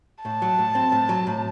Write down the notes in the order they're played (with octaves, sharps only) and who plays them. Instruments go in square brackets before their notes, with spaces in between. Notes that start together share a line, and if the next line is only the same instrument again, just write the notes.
[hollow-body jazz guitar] A2 [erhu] A5
[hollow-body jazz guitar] F#3
A2
C4
A2
F#3
A2